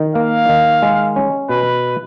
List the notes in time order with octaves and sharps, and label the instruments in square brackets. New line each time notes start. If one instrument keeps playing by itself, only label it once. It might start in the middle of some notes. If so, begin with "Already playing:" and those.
Already playing: [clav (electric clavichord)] D#3
[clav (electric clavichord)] A#3 [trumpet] F5
[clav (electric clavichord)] D#3
G#3
C#4
[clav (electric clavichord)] B2 [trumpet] B4